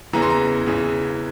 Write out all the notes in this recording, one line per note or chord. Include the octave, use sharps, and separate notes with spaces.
E2 C#3 E3 A#5
C6
A#5
E2 C#3 E3